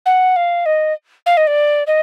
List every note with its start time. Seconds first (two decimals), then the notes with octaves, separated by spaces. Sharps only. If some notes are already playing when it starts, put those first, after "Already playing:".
0.06 F#5
0.36 F5
0.66 D#5
1.26 F5
1.37 D#5
1.47 D5
1.87 D#5